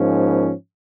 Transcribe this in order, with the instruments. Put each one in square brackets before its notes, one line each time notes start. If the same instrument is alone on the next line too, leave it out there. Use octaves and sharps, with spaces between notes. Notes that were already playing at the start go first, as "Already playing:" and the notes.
Already playing: [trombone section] G#2 F3 A#3 C#4